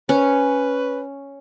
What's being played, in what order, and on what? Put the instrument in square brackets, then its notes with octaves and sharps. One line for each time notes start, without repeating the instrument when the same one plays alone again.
[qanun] C#4 [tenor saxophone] B4